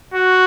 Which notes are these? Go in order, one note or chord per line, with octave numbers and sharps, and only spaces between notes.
F#4